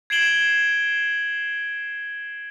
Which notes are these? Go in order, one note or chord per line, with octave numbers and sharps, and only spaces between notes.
G#6 C7 D7 E7 F#7 G7